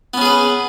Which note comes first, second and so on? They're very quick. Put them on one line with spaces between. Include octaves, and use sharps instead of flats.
B3 C#4 G#4 B4